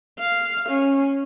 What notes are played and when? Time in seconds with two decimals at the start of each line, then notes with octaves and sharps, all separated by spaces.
0.19 F5
0.69 C#4